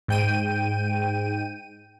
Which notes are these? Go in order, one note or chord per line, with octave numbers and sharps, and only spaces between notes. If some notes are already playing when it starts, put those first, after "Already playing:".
G#2 G5 D#7